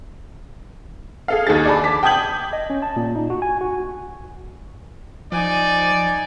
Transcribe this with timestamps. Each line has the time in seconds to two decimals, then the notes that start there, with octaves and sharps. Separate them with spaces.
1.28 G#4 A4 F5
1.47 D#2 D#4 G#4 A6
1.65 D5 G#5 A5 B5
1.84 A5 D6 B6
2.03 G5 A5 D#6 G6 G#6 F#7
2.53 D#5
2.70 C#4
2.82 A5
2.96 A#2
3.16 D#4
3.30 F#4
3.42 G#5
3.61 F#4
5.32 F3 D#4 D5 G#5